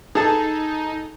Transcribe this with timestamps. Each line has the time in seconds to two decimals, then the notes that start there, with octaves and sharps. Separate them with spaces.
0.15 D#4 G#4 A4 A5